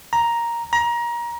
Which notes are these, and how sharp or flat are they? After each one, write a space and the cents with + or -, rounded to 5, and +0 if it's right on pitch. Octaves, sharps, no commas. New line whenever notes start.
A#5 +5
A#5 +25